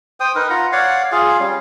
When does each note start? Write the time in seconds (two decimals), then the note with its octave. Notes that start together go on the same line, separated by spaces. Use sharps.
0.20 C5 G5 D#6
0.35 D#4 A#4 B4
0.50 F4 F#5 A#5
0.72 C#5 D5 F5 F#5
1.12 F4 G#4 F5
1.40 G3 C#4